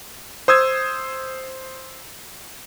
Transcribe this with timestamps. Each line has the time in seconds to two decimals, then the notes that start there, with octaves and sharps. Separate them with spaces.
0.48 C5 D#6 E6 G#6